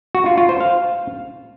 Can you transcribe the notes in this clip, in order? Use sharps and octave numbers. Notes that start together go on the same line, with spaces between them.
F#4
F4
F4
C5
F5